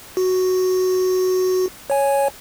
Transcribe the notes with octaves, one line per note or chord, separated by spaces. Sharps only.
F#4
C#5 G#5